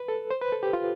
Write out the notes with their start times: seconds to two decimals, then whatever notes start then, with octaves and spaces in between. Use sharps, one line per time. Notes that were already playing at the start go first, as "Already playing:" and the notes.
Already playing: B4
0.08 A4
0.31 C5
0.42 B4
0.52 A4
0.63 G4
0.73 F4